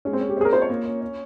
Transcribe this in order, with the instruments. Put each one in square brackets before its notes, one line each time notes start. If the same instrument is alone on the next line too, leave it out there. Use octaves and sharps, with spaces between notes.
[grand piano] G#3 [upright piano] C#4
[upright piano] C4
[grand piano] C#4
[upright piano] G4
[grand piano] C4 [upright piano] G#4
[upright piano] A#4
[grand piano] F4 [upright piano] C5
[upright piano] C#5
[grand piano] A#3
C#4
C#4